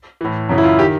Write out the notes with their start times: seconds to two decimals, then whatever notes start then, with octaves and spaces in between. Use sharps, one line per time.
0.21 A2 E3
0.49 F#2 C#3 E3
0.58 E4
0.64 F4
0.79 D#3 G4